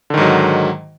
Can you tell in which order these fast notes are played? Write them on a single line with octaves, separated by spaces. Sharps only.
D3 D#3 G#2 F#3